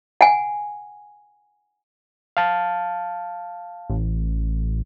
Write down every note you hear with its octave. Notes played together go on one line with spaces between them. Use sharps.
F#5 G#5
F5 A5
A1